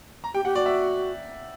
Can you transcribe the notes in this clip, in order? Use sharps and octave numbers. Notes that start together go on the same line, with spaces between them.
A#5
G4 G5
G4 F#5
F#4 D5
E5